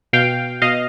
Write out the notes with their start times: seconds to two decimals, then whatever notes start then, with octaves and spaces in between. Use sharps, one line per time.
0.13 B2 F5 G5
0.62 B2 D#5 F5